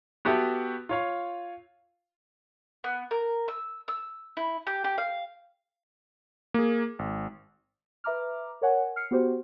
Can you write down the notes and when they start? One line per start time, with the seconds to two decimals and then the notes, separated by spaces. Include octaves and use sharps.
0.25 B3 F#4 G4 A4 E5
0.89 F4 C#5 F5
2.84 B3
3.11 A#4
3.48 E6
3.88 E6
4.37 E4
4.67 G4
4.84 G4
4.98 F5
6.54 A#3 G#4
6.99 G#1
8.04 B4 E5 A#5 D6 F6
8.62 A#4 C#5 F#5 G#5
8.96 F6 C7 C#7
9.11 B3 F#4 G4 C5